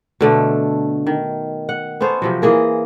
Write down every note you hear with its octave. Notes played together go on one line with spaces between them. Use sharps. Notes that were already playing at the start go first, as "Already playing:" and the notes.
B2 D3 A3
D#3
F#5
B3 C#4 A4 C5
C3 F3 F#3
E3 A#3 G#4 A#4